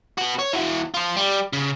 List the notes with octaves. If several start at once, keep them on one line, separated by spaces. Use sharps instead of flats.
B3 F#4
C#5
E3 F#4
F4 C5
G3
C#3